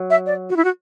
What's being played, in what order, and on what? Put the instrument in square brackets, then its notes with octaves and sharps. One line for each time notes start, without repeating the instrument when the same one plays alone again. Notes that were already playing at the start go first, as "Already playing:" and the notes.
Already playing: [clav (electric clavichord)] F#3
[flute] E5
D5
F#4
E4
F#4